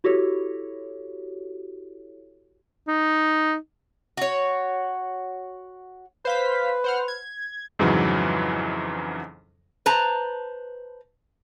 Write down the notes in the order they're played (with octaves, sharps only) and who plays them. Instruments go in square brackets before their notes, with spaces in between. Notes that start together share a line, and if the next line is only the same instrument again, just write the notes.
[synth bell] E4 F#4 G4 A4 C#5
[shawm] D#4
[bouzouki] F#4 C#5
[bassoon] B4 [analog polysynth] C5 F5 B6
[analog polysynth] C5 F#5 F6
G#6
[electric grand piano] F2 G#2 C#3 E3 F#3
[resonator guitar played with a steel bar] B4 C5 A5 A#5